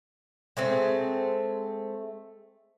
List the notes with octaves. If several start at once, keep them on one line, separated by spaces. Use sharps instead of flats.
G#3 A3 C4